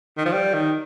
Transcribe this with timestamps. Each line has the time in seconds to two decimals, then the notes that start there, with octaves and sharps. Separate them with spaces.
0.17 D#3
0.26 F3
0.33 G3
0.54 D#3